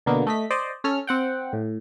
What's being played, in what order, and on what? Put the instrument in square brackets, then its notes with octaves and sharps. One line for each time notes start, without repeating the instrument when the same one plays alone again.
[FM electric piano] B2 D3 A#3 B3
A3 D#5 B6
C5 D5 D#5
C#4 A4 F6
C4 F#5 G5
A2